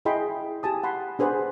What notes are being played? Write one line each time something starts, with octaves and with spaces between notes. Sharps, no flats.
E4 G#4 D#5 G5 B5 C6
G4 G#5 A5 D#6
F#5 B5 C6
D4 G#4 B4 C5 F#5